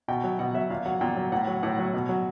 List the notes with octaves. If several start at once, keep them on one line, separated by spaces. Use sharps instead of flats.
B2 G5
F#3
B2 F#5
F#3 E5
A#2 F5
F#3 F#5
A#2 G5
F#3
A2 F#5
F#3
A2 F#5
F#3
B2
F#3